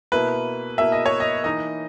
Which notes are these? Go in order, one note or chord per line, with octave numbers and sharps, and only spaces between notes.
B2 A#3 E4 B4
B2 A#3 E4 E5
D#5
C#5
D#5
E3 A#3 D#4 D#5